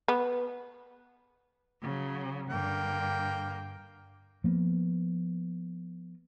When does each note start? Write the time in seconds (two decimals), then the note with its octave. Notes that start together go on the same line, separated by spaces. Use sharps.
0.08 B3
1.82 C#3 F#3
2.50 G2 D3 A#3 G5
4.44 F3 A#3 B3